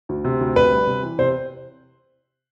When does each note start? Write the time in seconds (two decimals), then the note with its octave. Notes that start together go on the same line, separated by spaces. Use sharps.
0.09 D2
0.24 C3
0.41 D2
0.56 C3 B4
0.72 G3
0.87 C3
1.03 E3
1.19 C3 C5